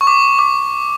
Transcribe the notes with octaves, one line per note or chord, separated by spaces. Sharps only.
C#6
D6
D6